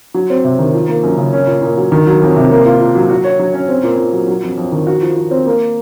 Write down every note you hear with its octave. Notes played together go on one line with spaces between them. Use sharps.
F#3
C4
C3
D#3
F3
A#3
F#2
C#3
C#4
A#2
A#2
F#3
D#3
F#3
F2
C3
A#3
F4
A#2
F#3
F#4
C#5
F#3
C#4
C4
A#2
A#2
F#3
F#3
F2
F2
D#3
F#4
F3
F3
C4
A#3